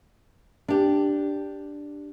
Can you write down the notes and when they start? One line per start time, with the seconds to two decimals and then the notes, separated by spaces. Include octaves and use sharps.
0.68 D4 G4